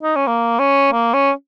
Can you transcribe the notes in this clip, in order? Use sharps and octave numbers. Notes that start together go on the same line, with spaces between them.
D#4
C#4
A#3
C#4
A#3
C#4